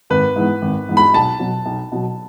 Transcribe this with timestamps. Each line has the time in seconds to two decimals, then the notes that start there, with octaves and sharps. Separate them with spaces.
0.10 G#1 B4
0.36 G#2 E3 B3
0.62 G#1
0.89 G#2 E3 B3
0.97 B5
1.14 B1 A5
1.40 B2 F#3
1.66 B1
1.92 B2 F#3